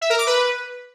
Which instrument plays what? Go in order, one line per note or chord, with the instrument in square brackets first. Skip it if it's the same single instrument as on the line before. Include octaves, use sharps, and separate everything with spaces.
[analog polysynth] E5
A#4
D6
B4